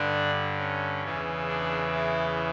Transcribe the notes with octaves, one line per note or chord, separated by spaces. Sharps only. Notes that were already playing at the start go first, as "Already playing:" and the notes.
Already playing: G2 D3 D4
C#4
E2 C#3 E3
D4
E4